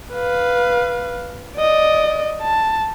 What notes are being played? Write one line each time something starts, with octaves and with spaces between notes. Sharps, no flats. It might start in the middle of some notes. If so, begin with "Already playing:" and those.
B4 F5
D5 D#5
A5